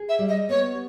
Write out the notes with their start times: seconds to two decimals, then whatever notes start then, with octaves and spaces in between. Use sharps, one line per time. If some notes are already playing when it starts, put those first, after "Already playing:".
Already playing: G#4
0.09 E5
0.19 G3
0.29 D#5
0.49 B3 C#5